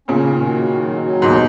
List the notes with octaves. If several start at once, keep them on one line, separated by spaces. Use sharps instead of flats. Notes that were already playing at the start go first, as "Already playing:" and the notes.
A#2 C#3 C#4
D#3
F#4
D#3
F#3
F#3
D#2 G#2 B2